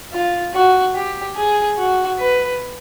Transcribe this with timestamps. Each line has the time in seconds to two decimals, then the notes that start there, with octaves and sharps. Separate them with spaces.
0.13 F4
0.54 F#4
0.95 G4
1.36 G#4
1.77 F#4
2.19 B4